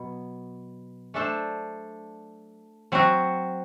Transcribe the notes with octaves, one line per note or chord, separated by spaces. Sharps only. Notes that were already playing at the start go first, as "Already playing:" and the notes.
Already playing: B2 F#3 B3
A3 D4 A4 C5
F#3 C4 F#4